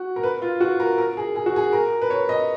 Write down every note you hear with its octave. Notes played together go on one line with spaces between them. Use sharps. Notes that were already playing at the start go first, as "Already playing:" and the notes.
Already playing: F#4
A#4
B4
F4
F#4
A#4
A#4
G#4
G#4
F#4
G#4
A#4
B4
C#5
D#5